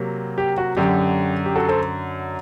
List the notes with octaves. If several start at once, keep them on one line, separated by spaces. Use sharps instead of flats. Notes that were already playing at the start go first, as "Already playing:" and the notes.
Already playing: C3 F#3 A#3
G4
F#4
F#2 D3 F#3 G4
G4
F#4 A4
A4 C5